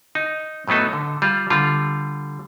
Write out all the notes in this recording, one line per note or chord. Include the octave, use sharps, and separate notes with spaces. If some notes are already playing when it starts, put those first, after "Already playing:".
D#4
A2 F#3 B3 D#4 A4
D3
G3 F4
D3 G3 F4